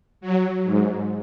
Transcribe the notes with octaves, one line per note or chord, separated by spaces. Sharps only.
F#3
G#2